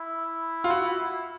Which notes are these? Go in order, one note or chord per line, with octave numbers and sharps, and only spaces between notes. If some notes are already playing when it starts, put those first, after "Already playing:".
Already playing: E4
F4
F#4